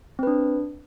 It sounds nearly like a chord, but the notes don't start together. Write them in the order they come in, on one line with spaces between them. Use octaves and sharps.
C4 B4 D4